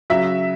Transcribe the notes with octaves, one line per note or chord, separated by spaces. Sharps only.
C#3 F#3 E5